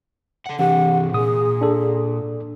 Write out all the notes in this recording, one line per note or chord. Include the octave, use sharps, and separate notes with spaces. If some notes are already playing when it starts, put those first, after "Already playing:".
A4 F#5
C3 E3 D4 G4 F#5
A#2 G#4 D#6
D4 A4